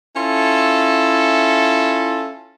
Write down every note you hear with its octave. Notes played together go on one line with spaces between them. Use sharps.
C#4 E4 F4 A4